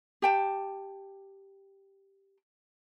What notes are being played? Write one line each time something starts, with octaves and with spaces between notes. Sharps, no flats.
G4 G5 A5